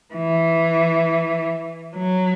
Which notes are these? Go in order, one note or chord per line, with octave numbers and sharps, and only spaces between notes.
E3
F#3